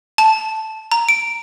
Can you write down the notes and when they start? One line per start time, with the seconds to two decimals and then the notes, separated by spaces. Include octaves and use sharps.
0.18 A5
0.92 A#5
1.09 D7